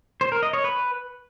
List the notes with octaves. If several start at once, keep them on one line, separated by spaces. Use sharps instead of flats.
C5
A#4
D#5
C#5
B4